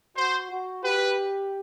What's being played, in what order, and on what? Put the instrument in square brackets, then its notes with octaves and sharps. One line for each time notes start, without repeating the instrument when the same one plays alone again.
[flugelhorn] F#4 [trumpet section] C5
[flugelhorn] F#4
[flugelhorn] G4 [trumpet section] B4